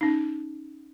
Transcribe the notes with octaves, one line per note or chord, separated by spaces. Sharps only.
C#4 D#4